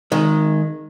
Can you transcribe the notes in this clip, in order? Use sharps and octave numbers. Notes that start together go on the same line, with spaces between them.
D#3 G#3